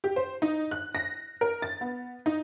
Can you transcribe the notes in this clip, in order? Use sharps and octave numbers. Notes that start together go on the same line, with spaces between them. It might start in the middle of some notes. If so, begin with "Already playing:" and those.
G4
C5
D#4
F#6
A#6
A#4
A6
B3
D#4